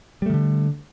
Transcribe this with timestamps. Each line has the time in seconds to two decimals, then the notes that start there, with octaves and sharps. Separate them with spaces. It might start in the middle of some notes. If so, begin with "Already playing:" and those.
0.22 G3
0.26 A3
0.30 D#3
0.34 D3